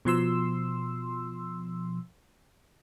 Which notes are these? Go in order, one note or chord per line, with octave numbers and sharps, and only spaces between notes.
B2 F3 C6 E6